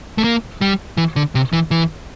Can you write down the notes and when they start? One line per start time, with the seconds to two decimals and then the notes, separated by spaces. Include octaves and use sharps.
0.18 A3
0.24 A#3
0.61 G3
0.97 E3
1.16 D3
1.35 C3
1.53 E3
1.71 E3